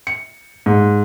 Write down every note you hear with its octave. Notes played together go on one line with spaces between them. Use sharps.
C#7
G#2